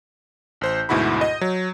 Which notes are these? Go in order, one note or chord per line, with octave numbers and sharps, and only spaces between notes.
A1 C5 G6
D2 G#2 B2 E4 F#4 B5
D#5
F#3